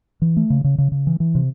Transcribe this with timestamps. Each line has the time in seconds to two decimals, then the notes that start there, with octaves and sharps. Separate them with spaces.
0.22 E3
0.37 A3
0.50 C#3
0.64 C#3
0.78 C#3
0.92 C#3
1.07 E3
1.20 E3
1.35 C3